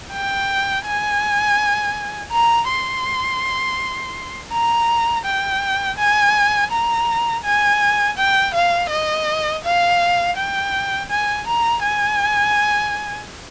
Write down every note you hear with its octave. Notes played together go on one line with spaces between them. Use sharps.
G5
G#5
A#5
C6
A#5
G5
G#5
A#5
G#5
G5
F5
D#5
F5
G5
G#5
A#5
G#5